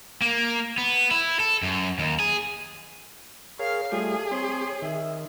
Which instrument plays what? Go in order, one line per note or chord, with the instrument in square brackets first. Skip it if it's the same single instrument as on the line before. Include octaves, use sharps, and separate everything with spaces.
[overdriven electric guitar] A#3
B3
E4
A4
F#2
D#2
G#4
[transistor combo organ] G#4 A#4 C#5 [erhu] F5 [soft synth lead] C7
[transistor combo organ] G3 A3 F4 [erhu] G#4 [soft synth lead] A4
[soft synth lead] C4 [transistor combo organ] C#5 C6
[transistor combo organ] D#3 [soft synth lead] E5